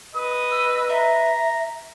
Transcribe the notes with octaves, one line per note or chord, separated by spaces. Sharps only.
B4 D#5 D#6
E6
E5 A#5